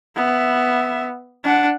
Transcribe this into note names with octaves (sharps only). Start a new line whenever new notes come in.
B3 E5
D4 F#5